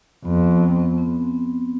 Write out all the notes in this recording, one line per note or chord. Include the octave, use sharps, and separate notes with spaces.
F2 B3
C4
B3
C4